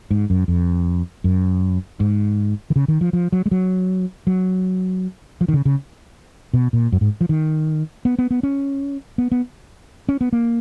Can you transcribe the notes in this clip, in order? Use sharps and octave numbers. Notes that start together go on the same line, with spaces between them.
G#2
F#2
F2
F#2
G#2
D#3
C#3
D#3
F3
F3
F#3
G#3
F#3
F#3
F3
D#3
C#3
C#3
B2
A#2
F#2
G#2
F3
D#3
B3
B3
B3
C#4
B3
B3
C#4
B3
A#3